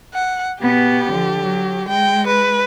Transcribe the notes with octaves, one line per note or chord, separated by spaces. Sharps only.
F#5
B2 B3 G4
D3 F3
F#3
G#3 G5
B4